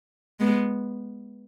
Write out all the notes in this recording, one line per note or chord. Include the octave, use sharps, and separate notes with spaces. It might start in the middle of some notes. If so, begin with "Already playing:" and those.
G#3 B3